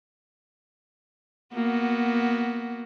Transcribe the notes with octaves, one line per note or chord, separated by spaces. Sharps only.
A#3 B3 F#4